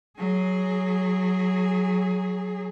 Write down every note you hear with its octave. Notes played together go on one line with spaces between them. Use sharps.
F#3 G#4